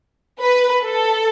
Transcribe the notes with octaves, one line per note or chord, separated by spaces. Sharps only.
B4
A4